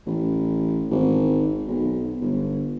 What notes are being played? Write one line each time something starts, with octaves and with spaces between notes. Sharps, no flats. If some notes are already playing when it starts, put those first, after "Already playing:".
A1
G#1
B1
G1